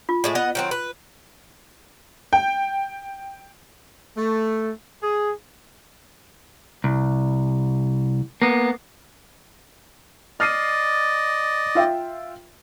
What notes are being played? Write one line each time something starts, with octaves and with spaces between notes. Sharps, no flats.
F4
A2 G#3 A3
B3 D#5 F#5
D#3 F#3 C4
B4
G5
A3
G#4
C2
A#3 B3
D5 D#5 F6 C7 D#7
F4 E5 G5